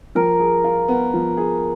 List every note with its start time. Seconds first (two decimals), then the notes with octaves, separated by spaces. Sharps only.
0.15 F3 A#4
0.40 G#4
0.64 F4
0.88 B3
1.14 F3
1.37 G#4